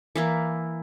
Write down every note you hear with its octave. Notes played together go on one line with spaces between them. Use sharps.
E3 A#3 E4